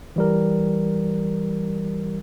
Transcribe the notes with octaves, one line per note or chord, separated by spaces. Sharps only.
E3 G3 A#4